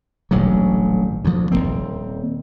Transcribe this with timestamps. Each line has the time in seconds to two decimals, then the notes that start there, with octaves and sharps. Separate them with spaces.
0.31 D#1 A1 G2 F#3
1.24 D2 F3
1.52 D#1 F#2 A#3 C4